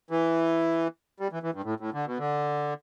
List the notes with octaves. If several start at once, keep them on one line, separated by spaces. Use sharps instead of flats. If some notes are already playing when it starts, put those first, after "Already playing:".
E3
G3
E3
E3
G2
A2
A2
D3
B2
D3